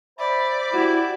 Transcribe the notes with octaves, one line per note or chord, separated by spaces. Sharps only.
C5 D5 E5 B5
E4 F#4 G4